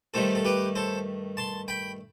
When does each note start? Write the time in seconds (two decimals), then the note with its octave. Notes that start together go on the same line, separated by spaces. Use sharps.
0.14 G2 D#3 A3 A4 C5
0.35 A4
0.45 G4 B4
0.75 A4 C5
1.37 A5 C6
1.68 G5 B5